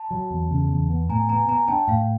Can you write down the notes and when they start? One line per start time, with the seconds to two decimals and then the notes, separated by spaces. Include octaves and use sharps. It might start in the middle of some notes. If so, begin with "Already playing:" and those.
Already playing: A5 B5
0.11 F#3
0.31 E2
0.51 C#3
0.70 E2
0.90 B3
1.09 A2 G#5 A#5
1.29 B3 G#5 A#5
1.48 B3 G#5 A#5
1.68 D4 G5 A5
1.88 A2 F5 G5